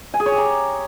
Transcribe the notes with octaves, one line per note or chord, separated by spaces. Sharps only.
G#5
G#4
C#5
G4
A#5